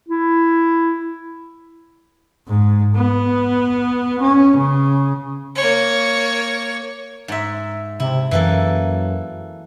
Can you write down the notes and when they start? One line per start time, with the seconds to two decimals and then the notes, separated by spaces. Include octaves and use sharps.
0.08 E4
2.47 G#2
2.95 B3
4.21 C#4
4.57 C#3
5.55 A#3 C#5
7.28 G#2 E5
8.00 C3 E4
8.31 F#2 E3 A#3 A4